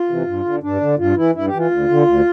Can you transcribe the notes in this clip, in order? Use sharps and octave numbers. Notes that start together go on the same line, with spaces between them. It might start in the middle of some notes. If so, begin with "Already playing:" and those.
Already playing: F4
C3 E3
G2
D3
G2 D4
D3
G2 F4
E3 E4
G2 E4
G4
E3
F4
D2
D3
D2